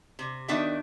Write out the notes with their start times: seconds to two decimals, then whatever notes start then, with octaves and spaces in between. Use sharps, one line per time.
0.19 C3
0.48 D#3 B3 D4 F#4 E5 G5